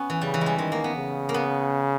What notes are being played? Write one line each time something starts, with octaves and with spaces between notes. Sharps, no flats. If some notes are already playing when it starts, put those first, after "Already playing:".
Already playing: B3 C#4
E3
C#3 G3
E3
G3 G#3
D#3 G#3
A#3
B3
C#3
A#3
B3